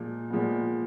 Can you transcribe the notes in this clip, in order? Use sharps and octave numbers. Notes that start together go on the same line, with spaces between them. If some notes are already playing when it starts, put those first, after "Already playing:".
Already playing: A#2 F3 G#3
A#2 F3 G#3 B3